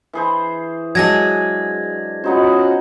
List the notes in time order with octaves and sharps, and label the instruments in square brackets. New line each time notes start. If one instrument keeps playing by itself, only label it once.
[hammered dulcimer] E3 G#4 C5
[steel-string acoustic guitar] F#3 G#3 G#4 [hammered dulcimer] D4 [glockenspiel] G#6 A#6
[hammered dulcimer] B3 D#4 C5 [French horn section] C#4 F4 F#4